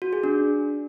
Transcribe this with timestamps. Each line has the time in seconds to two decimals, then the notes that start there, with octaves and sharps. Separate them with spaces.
0.02 F#4
0.13 G#4
0.24 D4